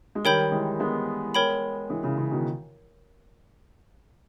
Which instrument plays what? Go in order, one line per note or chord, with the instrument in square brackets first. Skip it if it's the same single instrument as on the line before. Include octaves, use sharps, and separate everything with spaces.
[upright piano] G#3
[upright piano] D#3 G3 [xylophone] A#4 C#5 G5 B5 G6
[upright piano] E3 G#3
G#3 B3
[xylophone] A#4 C#5 G5 B5
[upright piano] E3 G#3
C#3 E3
C#3 E3
B2 D#3